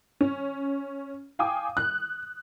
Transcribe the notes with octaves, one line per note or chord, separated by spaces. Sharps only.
C#4
F5 G5 G#5 D6 D#6
F#6